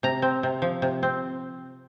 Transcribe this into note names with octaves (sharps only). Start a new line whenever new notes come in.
C3 A#5
C4
C3
F3
C3
C4